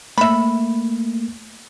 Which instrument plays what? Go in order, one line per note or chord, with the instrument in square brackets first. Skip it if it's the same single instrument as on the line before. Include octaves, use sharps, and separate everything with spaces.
[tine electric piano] A3 A#3 [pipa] E5 B5